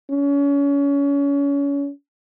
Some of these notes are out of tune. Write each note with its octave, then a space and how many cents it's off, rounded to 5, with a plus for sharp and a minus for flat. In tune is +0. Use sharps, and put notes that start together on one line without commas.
C#4 +30